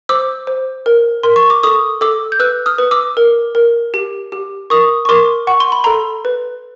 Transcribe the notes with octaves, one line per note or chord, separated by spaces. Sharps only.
C5 D6 E6
C5
A#4
A#4 C6
C#6
D6
A4 C#6 D#6
A4 D6 E6
G6
B4 E6 F#6
D#6 F6
B4
D6 E6
A#4
A#4
G4
G4
A#4 C#6 D#6
C#6
A#4 C6 D6
F#5 C#6
C6
B5
A4 A#5 C6
B4